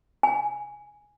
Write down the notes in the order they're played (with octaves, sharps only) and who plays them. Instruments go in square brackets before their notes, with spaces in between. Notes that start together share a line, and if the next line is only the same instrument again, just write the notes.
[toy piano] G#5